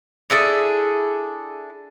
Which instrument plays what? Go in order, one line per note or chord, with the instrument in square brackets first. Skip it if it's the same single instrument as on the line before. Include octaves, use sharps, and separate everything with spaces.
[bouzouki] D4 E4 G#4 A4